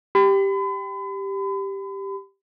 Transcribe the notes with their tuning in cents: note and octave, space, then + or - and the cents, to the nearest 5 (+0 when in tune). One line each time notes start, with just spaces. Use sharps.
G4 +0 B5 +40